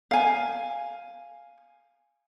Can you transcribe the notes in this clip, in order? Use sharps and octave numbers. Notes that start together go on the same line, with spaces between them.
F5 G#5